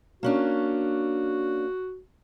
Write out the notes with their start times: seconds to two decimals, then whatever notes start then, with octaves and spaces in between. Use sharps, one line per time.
0.23 A#3 C#4 D4 F#4